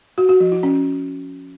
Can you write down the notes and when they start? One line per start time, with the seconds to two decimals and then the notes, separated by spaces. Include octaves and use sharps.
0.18 F#4
0.29 F#4
0.40 F3
0.52 E4
0.63 C#4